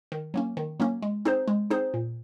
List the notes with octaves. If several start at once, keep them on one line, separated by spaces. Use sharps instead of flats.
D#3
F#3 A#3 C#4
D#3
F#3 A#3 C#4
G#3
C4 D#4 G#4 C5
G#3
C4 D#4 G#4 C5
A#2